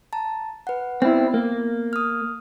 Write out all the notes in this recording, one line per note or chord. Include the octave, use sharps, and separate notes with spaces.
A5 A#5
B4 F#5
B3 C4 E4
A#3
D#6 F6